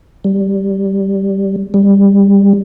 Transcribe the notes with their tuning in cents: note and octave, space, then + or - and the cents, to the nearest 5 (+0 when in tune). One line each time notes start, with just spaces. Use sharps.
G3 -5
G3 +20